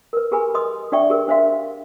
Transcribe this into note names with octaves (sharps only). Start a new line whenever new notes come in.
A#4 B4
G4 G#4 A#4 B4 G#5 B5
B4 D#5 C6 D#6
D4 C5 D5 E5 G5 C#6
G4 G#4 A#4 B4
D4 C5 E5 F5 C6